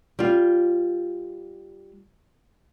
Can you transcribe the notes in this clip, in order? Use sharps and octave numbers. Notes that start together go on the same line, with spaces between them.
G3 F4